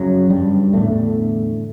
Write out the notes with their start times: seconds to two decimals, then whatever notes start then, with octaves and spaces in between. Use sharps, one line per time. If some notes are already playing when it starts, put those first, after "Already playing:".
Already playing: F#2 C#3 F#3
0.30 G2 G3
0.73 E2 A2 D3 A3